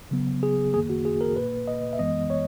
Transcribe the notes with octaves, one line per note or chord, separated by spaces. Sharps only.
C#3 F#3 B3
G#4
F#2 D#3 A#3 G#4
F#4
G#4
A#4
A#2 A#3 B4
D#5
E5
F#2 E3 G#3 B3 D#5
C#5